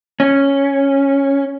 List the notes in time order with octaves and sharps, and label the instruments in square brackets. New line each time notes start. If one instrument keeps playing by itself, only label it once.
[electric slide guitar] C#4